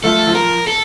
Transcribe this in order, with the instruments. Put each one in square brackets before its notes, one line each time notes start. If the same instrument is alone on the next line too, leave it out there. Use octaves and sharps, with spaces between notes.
[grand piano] F3 A3 [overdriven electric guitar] A4
[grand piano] F3
[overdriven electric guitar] A#4
A4